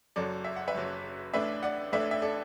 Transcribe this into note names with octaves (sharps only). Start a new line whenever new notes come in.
F#1 F#2 F#3 A4 D5
E5
F#5
B4 E5
F#1 F#2 F#3
A1 A2 A3 D4 B4 E5
D5 F#5
A1 A2 A3 D4 B4 E5
E5
A4 D5